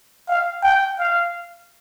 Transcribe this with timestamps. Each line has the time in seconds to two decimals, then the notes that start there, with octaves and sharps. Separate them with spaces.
0.28 F5
0.63 G5
0.98 F5